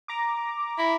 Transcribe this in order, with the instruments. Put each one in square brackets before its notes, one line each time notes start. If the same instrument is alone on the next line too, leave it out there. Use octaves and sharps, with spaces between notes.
[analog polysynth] A#5 D6
[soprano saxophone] E4